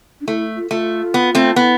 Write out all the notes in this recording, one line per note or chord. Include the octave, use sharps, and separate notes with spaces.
D4
A3 E4
F4
A3 F4
B3
A3 C4
B3 E4 F4